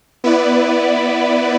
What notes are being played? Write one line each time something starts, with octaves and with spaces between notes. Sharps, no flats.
B3 E4 B4 D5